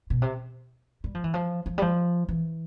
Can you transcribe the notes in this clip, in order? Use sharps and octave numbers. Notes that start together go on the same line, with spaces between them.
B2
C3
G3
F3
E3
F3
F3
G3
F3
E3